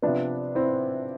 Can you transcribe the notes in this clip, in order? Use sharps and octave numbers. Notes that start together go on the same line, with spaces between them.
C3 F3 B3 D4
C4 E4